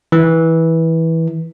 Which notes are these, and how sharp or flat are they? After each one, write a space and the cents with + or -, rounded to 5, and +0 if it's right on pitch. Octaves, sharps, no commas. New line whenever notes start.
E3 -15